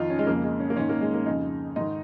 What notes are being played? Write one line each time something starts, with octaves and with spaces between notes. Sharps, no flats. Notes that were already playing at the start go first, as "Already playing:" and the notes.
Already playing: F2 D#3 D#4 F4
C#4
G#3
F2 C#3 A#3
G#3
C#4
A#3
G#2 D#3 C#4
A#3
G#3
A#3
F2 C#3 D#4
G#2 D#3 D#4